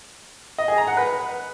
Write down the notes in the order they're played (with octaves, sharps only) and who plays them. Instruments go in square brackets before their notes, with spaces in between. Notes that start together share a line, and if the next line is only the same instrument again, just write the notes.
[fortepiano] D#5
G#4
A#5
F#5
B4